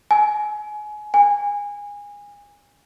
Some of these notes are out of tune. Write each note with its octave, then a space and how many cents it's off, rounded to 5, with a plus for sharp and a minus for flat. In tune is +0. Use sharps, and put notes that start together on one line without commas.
G#5 +25
G#5 -20